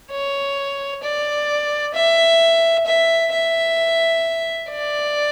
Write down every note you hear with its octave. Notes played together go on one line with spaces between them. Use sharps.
C#5
D5
E5
E5
E5
D5